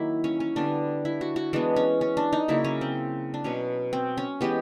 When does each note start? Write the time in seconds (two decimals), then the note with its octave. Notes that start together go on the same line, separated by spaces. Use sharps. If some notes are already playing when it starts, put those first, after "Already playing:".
Already playing: D#3 F#3 A#3 E4
0.24 C#4
0.40 C#4
0.56 D3 G3 B3 D4
1.05 E4
1.21 F#4
1.36 F#4
1.53 E3 G#3 B3 D4
1.76 C#4
2.01 C#4
2.17 D4
2.33 D#4
2.48 C#3 F#3 A#3 E4
2.64 C#4
2.81 C4
3.34 D4
3.44 B2 F#3 B3 C#4
3.93 C4
4.18 C#4
4.41 E3 G#3 B3 G4